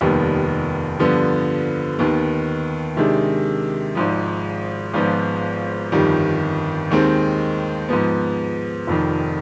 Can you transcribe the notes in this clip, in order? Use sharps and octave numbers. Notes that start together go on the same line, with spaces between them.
F1 D#2 D#3 G3 B3
G2 D3 F3 B3 F4
D#2 D#3 B3
C3 D#3 G#3 D4
G#1 G#2 F3
G#1 G#2 F3 B3 F4
G1 F2 D#3 G3
D#2 D#3 G#3 C4
G#2 F3 B3
F1 F2 D#3